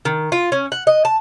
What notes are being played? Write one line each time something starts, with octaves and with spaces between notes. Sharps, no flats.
D#3
F4
C#4
F#5
D#5
A5